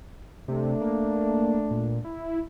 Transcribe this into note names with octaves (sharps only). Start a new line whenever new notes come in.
C3 A3 D4
A#3
A#2
E4